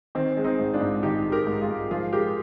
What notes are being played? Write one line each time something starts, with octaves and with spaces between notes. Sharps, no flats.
D#3 C4
G#3
C4 D#4
G#2
D4 F4
G#2
D#3 D#4 G4
G#3
G4 A#4
G#2
F4 G#4
G#2
F3 F4 G#4
G#3 G4 A#4